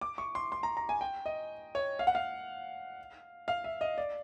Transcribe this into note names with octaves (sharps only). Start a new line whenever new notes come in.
D6
C#6
C6
C6
A#5
A#5
G#5
G5
D#5
C#5
F5
F#5
F5
F5
E5
D#5
D5